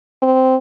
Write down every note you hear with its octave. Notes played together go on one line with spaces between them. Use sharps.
C4